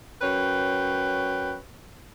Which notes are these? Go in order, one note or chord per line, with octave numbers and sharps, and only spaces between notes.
F#2 F#4 B4 C#5 G5